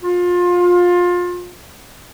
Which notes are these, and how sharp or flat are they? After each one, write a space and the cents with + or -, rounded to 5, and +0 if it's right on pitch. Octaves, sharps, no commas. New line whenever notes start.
F4 +25